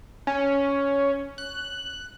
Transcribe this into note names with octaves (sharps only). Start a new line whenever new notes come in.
C#4
F#6